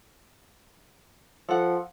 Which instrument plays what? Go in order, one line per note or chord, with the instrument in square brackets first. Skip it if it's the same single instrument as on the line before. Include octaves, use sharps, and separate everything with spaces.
[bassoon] F3 [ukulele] A4 F#5